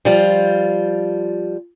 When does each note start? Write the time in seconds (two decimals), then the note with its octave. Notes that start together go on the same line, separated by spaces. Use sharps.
0.05 F3 G3 F4